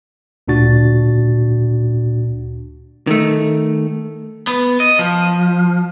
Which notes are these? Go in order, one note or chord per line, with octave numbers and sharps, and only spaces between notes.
D2 A#2 D4 F#4 A6
D#3 A3
B3
D#5
F3